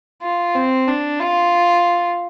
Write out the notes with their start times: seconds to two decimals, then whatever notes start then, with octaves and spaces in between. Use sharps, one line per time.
0.22 F4
0.55 C4
0.88 D4
1.20 F4